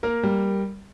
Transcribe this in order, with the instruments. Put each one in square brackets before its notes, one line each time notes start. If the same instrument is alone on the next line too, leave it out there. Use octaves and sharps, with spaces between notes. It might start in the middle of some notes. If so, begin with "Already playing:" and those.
[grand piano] A#3 A#4
G3